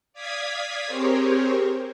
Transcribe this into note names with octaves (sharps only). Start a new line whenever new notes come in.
D5 F5 D#6 G#6 B6
C4 G4 G#4 A#4 C5 C#5